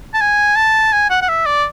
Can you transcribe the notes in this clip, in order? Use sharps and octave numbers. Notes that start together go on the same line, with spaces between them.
A5
G#5
A5
G#5
F#5
F#5
E5
D5